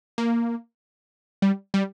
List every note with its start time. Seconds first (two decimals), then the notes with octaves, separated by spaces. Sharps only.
0.18 A#3
1.42 G3
1.74 G3